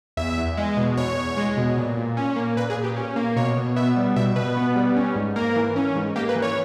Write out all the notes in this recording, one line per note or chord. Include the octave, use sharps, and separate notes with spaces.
E2 E5
E2
G#3
B2
E2 C#5
E2
G#3
B2
A#2
A#2
C#4
A#3
A#2 B4
G#4
A#2
G4
C#4
A#3
B2 C#5
B2
B3 E5
G3
B2 E5
B2 B4
B3
G3
C#4
G#2
A#3 A#4
E3
C#4
G#2
A#3 G4
B4
E3
C#5